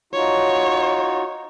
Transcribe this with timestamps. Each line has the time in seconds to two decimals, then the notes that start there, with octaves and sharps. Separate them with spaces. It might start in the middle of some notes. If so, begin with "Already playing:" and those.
0.13 D#4 F4 F#4 C#5